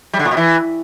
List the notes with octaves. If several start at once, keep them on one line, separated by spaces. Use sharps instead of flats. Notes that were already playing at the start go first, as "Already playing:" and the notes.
G3
D3
A#2
B2
E3